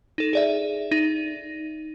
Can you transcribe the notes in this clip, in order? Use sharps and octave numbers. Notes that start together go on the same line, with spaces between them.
D#4 A4
G#4 D5 E5
D#4